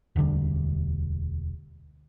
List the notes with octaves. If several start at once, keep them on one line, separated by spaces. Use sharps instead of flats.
E1 D2 D3 G3